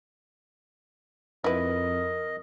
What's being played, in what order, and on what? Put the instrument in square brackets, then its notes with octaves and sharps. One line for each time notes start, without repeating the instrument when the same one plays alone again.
[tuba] F2 [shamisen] E4 B4 [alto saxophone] A#4 [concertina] D#5